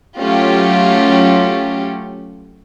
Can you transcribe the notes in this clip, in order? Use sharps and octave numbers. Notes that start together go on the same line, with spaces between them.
F#3 A3 C#4 F4 G4